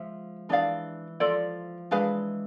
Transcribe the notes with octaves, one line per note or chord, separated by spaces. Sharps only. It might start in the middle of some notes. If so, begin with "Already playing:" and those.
Already playing: F3 G#3 E5
E3 D4 G#4 D5 F5
F3 F4 A4 D5
E3 G#3 D4 G#4 B4 F5